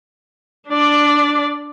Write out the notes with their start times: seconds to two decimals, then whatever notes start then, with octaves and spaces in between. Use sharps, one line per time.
0.69 D4 D5